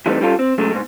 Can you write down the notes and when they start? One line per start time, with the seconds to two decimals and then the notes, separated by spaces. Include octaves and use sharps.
0.06 E3 G3 A3 B3 C4 D#4
0.21 G3 C#4 F4 A4
0.39 C4
0.58 C#3 F#3 G#3 A3
0.71 G#2 B2